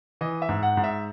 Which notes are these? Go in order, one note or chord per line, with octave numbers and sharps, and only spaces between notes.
E3 D#5
E5
G#2
F#5
G#2
E5